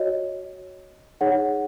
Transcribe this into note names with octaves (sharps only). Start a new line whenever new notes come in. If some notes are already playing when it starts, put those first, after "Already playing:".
Already playing: F#4 C#5 D#5
D#4 G#4 C#5 F#5